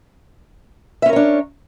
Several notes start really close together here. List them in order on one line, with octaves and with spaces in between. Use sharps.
E5 C#4 A#4 C#5 D4